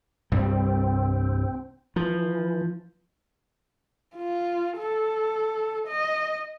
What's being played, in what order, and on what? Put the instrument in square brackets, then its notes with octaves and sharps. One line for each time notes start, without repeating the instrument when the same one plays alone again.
[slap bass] C2 G2 G3 [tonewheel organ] C4
[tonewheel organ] E3 [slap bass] F3
[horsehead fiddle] F4
A4
D#5